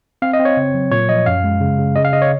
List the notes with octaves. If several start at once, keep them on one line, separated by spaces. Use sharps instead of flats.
C4 F5
D#5
C4
C#5
C#3
F#3
A#2 C#5
F3 D#5
F#2 F5
G#3
C#3
C#3
C#3 D#5
F5
C#3 D#5
C#5